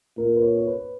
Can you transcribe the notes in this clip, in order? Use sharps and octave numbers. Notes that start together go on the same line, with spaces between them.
A#2 A#4
B4
C#5
C#5
B4